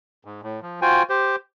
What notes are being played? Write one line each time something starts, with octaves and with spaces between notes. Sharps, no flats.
G#2
A2
F3
F4 F#4 C5 G5 G#5
G4 C5